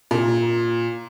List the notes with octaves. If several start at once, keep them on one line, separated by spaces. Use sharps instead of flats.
A#2